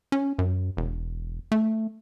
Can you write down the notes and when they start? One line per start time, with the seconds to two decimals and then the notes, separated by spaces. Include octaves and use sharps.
0.12 C#4
0.39 F#2
0.77 E1
1.52 A3